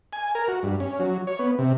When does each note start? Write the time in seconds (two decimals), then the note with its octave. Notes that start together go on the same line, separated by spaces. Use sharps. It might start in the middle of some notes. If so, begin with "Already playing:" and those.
0.13 G#5
0.35 A#4
0.48 F#4
0.63 G2
0.80 C#4
1.00 F#3
1.27 C#5
1.39 B3
1.59 C3